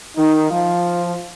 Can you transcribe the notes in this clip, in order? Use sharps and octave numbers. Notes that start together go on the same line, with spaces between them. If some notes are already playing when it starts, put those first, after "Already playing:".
D#3 D#4
F3 F4